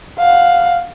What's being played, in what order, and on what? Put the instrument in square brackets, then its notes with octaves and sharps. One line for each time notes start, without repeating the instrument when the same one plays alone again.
[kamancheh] F5 F#5